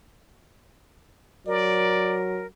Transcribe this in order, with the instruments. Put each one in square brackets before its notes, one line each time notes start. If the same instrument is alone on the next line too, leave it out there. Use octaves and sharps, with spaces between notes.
[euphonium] F#3 [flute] A#4 [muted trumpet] D5